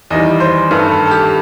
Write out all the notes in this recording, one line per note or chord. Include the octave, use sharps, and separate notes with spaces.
E2 D#3 G3 D#5
C5
G2 D#3 A3 B4
A4
A4
G4